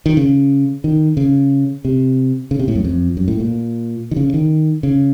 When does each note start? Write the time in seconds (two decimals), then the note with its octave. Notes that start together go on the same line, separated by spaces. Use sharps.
0.06 D#3
0.17 C#3
0.84 D#3
1.17 C#3
1.85 C3
2.51 C#3
2.59 C3
2.68 A2
2.75 F#2
2.85 F2
3.17 F#2
3.28 A2
3.40 A#2
4.11 D#3
4.17 C#3
4.34 D#3
4.83 C#3